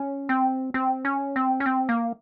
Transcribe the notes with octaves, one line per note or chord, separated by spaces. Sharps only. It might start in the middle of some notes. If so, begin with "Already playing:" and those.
Already playing: C#4
C4
C4
C#4
C4
C#4
C4
A#3